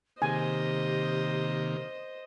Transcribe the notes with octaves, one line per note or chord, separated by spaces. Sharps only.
C3 D#3 A#3 G4 C5 D#5 G#5